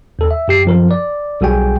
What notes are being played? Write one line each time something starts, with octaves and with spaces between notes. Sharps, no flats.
D#2 A4
E5
F#2 G4 C7
F#2 F3 A#4
D5
B1 G3 F#4 G#4 G5 G#5